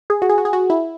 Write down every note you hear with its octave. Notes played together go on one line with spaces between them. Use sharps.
G#4
F#4
G#4
F#4
G#4
F#4
E4